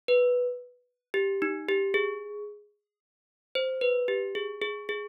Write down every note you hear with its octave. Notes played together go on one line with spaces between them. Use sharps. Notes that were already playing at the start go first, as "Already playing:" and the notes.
B4
G4
D#4
G4
G#4
C5
B4
G4
G#4
G#4
G#4